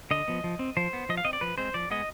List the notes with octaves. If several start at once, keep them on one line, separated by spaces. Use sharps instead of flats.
D3 D#5
F3 B3
F3
C4
F3 C5
B3
F3 D#5
F5
C4 D#5
D5
F3 B4
G#3 C4 C5
F3 D5
G#3 B3 D#5